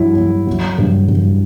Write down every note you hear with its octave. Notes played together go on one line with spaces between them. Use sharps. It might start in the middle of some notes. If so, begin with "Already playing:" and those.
Already playing: G2 F#3 E4
F#3
F#3
G2
G2